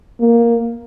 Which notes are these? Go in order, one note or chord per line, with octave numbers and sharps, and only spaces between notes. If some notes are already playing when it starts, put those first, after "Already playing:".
A#3